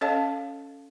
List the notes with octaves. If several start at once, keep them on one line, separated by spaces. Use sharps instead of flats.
C#4 A4 C#5 D#5 F5 A5